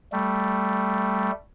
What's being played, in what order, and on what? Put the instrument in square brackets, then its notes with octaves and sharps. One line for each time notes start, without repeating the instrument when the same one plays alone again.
[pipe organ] G3 A3